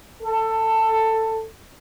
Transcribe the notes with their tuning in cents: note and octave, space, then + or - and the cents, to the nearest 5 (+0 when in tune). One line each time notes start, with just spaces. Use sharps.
A4 +15